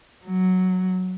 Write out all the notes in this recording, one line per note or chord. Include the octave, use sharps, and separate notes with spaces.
F#3